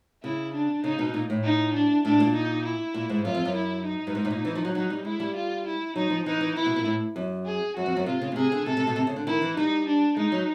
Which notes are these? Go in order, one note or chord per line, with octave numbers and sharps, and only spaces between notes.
C#3 E4
D4
C#3 D#4
B2
A#2
A2
D#4
D4
A2 D4
A#2
D#4
E4
A#2
G#2
F#2 F4
F2
F#2
E4
D#4
G2
G#2
A2
A#2
E3
F3
F#3
F#3 D#4
G3
G#3 E4
G3
F4
E4
F#3 D#4
F3
E3 D#4
E3
E3 E4
B2
A#2
A2
F#2
G#4
F#2 F#4
F2
F#2
C3 F4
C#3
B2
C3 G#4
D3
C3 A4
C3
B2
C3
C#3
D3
D#3 E4
E3
G3 D#4
D4
G#3 D#4
F#3